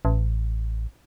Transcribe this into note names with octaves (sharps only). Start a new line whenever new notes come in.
A1